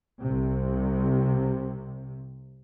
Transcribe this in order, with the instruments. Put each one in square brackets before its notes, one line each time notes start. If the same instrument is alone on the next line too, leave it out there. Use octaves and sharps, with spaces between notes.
[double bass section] C2 C3